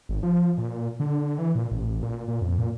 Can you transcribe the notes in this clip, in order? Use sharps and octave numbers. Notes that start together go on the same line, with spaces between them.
G#1
F3
A#2
D3
E3
A#2
A1
A#2
A#2
F2
A#2